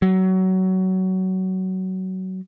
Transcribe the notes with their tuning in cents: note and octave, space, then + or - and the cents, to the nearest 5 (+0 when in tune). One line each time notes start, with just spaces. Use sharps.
F#3 +20